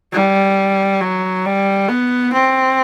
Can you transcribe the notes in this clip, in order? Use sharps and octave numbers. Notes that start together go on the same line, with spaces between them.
G3
F#3
G3
B3
C4